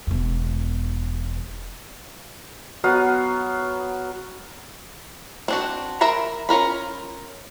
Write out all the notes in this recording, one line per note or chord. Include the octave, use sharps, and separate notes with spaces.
E1 E2
F#3 B3 F5 D#6
C4 D4 F#4
A#4 C5 E5 A#5 B5
C#4 F4 A#4 B5